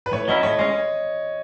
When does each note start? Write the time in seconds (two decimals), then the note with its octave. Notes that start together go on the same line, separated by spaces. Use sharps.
0.06 B4
0.12 A2 C#5
0.28 F#3 C#4 E4 D#5
0.43 A2 C#5
0.59 G#3 C#4 D#5